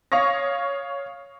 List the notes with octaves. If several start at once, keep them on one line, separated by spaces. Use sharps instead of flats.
C#5 F5 C#6 D#6 A#6